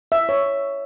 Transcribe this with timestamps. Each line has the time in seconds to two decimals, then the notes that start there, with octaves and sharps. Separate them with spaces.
0.12 E5
0.29 C#5